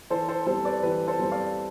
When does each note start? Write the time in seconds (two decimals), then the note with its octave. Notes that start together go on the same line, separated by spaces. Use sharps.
0.10 E3 A4 C5
0.28 A4 C5
0.47 G3 C4 A4 C5
0.65 B4 D5
0.83 E3 G4 B4
1.07 A4 C5
1.19 G3 C4
1.31 D5 F5